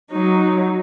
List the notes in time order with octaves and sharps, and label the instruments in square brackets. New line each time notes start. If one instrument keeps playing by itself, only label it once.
[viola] F#3 D#4